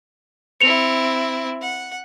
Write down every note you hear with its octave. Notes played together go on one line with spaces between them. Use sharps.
C4 E4 C#7 F7
F#5